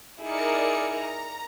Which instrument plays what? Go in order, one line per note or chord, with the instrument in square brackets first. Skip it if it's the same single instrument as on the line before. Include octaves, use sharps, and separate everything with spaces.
[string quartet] D#4 E4 G#4 [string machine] A#4 D5 C#7
[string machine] A#5